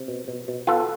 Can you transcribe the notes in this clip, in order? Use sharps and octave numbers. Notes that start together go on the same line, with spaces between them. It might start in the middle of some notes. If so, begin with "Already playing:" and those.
Already playing: C3
B2
B2
B2
B3 F4 A4